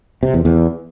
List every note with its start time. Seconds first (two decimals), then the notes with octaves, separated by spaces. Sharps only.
0.23 C3
0.34 E2
0.45 E2